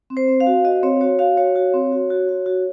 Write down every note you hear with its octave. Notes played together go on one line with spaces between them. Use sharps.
C4
C5
C4
F5
F#4
F#4 D#5
C4 C#5
F#4 C#5
F#4 F5
F#4 C#5
F#4
C4
F#4
F#4
F#4
F#4